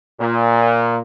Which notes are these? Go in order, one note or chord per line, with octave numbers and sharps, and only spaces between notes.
A#2